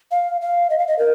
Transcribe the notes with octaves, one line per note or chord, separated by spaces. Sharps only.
F5
F5
D#5
F5
D#5
A#4